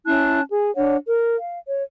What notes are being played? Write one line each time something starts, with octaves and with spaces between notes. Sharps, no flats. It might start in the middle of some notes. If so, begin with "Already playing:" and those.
C#4 E4 A5 F#6
G#4
D4 C#5 F#5
A#4
F5
C#5